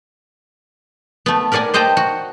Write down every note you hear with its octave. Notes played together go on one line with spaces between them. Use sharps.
A3 B3
A#4 B4 D5 F#5 G#5
C5 D#5 F#5 G5 A5 A#5
F#4